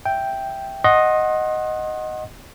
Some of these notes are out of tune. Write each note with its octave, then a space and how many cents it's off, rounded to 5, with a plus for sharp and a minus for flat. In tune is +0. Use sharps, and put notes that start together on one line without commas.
E5 +0 G5 +0
D#5 +0 F#5 +0 C6 +35